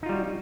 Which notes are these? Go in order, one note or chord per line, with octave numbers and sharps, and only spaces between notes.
G3 D#4 F4 F#4